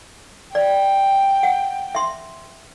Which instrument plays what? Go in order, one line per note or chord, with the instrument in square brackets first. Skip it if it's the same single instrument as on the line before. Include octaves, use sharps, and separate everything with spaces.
[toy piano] D5 [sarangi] G5
[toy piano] F#5
E5 C6